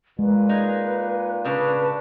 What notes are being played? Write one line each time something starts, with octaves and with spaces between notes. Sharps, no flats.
A#2 G#3 B4
D#4 G#4
A2 C#3 D4 B4